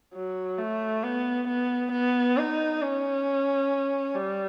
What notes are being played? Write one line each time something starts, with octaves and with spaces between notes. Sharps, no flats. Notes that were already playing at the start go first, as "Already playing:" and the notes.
F#3
A3
B3
B3
B3
D#4
C#4
G3